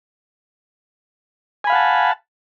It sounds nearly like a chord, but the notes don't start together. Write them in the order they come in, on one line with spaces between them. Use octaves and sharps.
G#5 B5 F5 F#5 A5